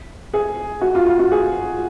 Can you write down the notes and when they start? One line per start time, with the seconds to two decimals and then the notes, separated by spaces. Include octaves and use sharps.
0.34 G#4
0.81 F#4
0.95 F4
1.06 F4
1.19 F#4
1.32 G#4